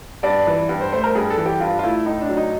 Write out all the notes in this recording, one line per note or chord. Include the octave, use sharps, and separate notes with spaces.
G2 D5
E3
G2
C5
A3 C5
A#4
G2 G#4
A4
E3
G4
G2 F4
F4
A3 E4
A2 D#4
D4
F#3
D#4